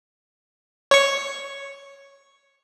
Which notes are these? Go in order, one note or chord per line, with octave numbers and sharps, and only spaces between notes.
C#5 C#6